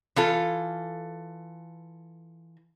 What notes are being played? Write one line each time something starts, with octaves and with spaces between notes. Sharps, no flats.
E3 F4 A4